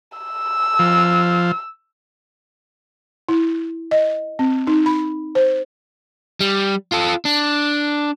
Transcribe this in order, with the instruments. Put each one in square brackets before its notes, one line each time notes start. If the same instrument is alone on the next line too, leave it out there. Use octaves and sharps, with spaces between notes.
[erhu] E6
[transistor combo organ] F3
[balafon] E4
D#5
C4
D#4
B5
C5
[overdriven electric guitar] G3
F4 A4
D4